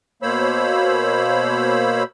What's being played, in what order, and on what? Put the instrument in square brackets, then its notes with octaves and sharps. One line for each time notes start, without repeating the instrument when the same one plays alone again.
[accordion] B2 A#3 C5 C#5 B5 E6